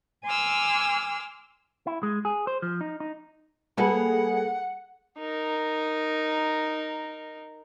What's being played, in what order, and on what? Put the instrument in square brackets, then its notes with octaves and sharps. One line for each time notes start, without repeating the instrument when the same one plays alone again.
[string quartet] G#5 C6 D6 E6 F6
[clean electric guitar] E4
G#3
G#4
C5
F3
D#4
D#4
[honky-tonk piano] G3 G#4 [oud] A#3 A4 B4 [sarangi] F#5
[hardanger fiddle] D#4 A#4